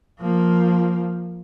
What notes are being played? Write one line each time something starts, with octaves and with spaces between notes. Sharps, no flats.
F3 A#3